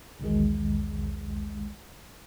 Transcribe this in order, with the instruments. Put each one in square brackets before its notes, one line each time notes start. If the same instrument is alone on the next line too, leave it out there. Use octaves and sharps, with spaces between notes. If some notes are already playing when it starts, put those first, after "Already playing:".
[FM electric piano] B1 E2 B2 D#3 G#3